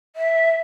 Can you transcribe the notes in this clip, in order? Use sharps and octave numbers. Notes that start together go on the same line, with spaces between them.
E5